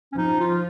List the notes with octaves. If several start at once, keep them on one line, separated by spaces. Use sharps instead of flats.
C#4
F3 D#4
F4